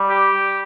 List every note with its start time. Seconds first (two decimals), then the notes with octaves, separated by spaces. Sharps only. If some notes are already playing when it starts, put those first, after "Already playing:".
Already playing: G3
0.09 G4